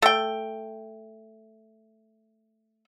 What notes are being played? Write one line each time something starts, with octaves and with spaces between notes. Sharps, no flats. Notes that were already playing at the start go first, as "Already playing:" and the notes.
A3 G5